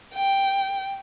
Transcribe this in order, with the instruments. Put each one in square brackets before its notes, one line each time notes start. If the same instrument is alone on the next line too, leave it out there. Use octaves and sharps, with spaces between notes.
[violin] G5